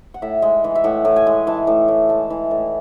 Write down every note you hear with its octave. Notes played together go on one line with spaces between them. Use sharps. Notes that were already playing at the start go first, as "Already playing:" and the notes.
F#5
A2 E5
G#3
E3
E5
A2 F#5
A2
G#5
G#3
E3 A5
A2
A2
G#3 A5
E3
A2